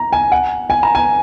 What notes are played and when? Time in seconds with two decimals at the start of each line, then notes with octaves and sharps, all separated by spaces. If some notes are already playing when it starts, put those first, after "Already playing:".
Already playing: A#5
0.13 G#5
0.32 F#5
0.70 G#5
0.83 A#5
0.95 G#5